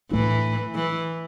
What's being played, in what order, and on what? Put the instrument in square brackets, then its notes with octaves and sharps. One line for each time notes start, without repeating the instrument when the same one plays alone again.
[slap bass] A2 A3 D4 [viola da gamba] E3
[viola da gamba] E3